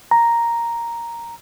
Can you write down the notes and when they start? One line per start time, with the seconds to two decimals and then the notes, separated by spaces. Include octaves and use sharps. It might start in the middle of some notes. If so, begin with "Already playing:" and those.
0.11 A#5